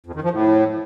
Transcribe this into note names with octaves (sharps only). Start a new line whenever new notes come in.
F2
D#3
F3
A2